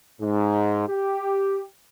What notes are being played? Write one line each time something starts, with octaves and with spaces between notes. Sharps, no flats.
G#2
G4